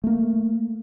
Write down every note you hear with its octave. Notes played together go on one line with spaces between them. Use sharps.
A3 A#3